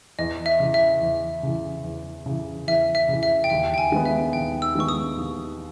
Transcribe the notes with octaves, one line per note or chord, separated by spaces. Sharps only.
E2 D#5
E5
C#3 E3
E5
E2
C#3 E3
E2
C#3 E3
E2 E5
E5
C#3 E3
E5
G5
D#2 E5
G5
G#5
D#3 G#3 B3
E5
D#2 G5
E6
D#3 G#3 B3 C#6
D#6
D#2